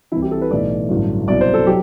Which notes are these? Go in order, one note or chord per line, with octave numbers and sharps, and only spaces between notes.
C2 C3 E3 E4
G4
A4
B4
B1 A2 E3 D5
A1 G2 D3 F#3
C2 B2 F#3 D5
C5
A4
F#3 G4